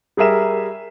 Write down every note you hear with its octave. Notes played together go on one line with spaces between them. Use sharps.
G3 G#4 A#4 E5 E7